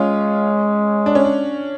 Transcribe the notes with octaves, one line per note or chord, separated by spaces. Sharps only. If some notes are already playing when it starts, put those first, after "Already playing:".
Already playing: G#3 C#4 F4
D4
C#4
D4